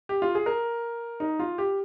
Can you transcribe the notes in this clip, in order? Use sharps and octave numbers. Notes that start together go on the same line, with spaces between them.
G4
F4
G#4
A#4
D#4
F4
G4